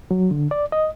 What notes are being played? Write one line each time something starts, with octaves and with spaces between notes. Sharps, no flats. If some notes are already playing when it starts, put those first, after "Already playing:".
F#3
D3
D5
D#5